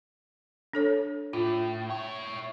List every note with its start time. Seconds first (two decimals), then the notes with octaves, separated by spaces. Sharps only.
0.73 D4 A4 C#5
1.33 A2 F4
1.90 E4 C#5